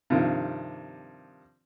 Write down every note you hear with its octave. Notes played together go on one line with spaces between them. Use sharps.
G2 C3 D#3 F3